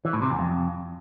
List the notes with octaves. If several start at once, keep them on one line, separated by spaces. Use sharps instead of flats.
E3
A2
C3
E2
F2